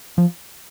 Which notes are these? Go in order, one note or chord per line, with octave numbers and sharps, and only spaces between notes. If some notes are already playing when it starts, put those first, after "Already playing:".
F3